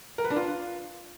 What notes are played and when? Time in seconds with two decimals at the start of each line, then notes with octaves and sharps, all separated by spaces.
0.18 A#4
0.24 B4
0.30 D4
0.36 F4